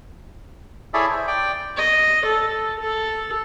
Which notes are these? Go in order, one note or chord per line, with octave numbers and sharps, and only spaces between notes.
E4 G#4 A4 C#5 D5 E5
C5
D5 G5
D#5
A4
A4